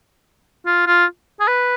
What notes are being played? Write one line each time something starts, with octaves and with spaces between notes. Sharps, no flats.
F4
F4
G#4
B4